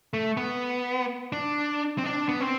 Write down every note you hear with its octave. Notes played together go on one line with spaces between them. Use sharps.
A3
B3
D4
C4
D4
B3
C4